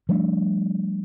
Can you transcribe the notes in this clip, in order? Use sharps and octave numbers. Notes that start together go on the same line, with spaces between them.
F3 G3 A3 D4